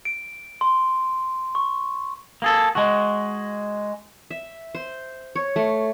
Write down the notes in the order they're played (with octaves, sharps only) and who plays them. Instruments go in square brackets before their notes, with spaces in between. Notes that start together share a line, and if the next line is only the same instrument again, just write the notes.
[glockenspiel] D7
C6
C#6
[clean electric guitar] A#3 G#4 A4
G#3 F#4
[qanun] E5
C5
C#5
A3